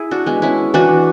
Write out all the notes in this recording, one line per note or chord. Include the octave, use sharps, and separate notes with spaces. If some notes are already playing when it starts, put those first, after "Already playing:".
Already playing: E4 G#4
D4 F#4
G#3 B3
C#4 E4
E3 D4 F#4